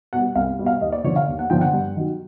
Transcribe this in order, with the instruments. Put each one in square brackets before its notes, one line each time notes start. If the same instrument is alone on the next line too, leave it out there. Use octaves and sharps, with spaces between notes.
[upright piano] B2 G3 F#5
C2 F5
B2 G3
F5
D#2 D#5
D5
D3 F3 C#5
F5
D#2
F#5
D3 F3 G5
F#5
G2
D#3 F#3